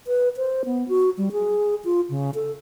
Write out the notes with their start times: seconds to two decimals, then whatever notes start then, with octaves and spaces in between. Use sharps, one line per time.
0.07 B4
0.37 C5
0.65 B3
0.89 F#4
1.18 G3
1.32 G#4
1.85 F4
2.10 C#3
2.34 A4